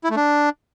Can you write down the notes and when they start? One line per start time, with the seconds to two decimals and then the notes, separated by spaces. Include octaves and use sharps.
0.04 E4
0.10 A3
0.17 D4